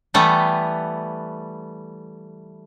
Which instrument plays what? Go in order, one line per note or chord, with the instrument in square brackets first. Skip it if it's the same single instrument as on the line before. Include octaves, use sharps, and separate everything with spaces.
[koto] E3 G3 A3 B3